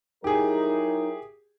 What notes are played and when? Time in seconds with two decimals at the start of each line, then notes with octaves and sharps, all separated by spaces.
0.24 F#3 D#4 E4 G4 G#4 A#4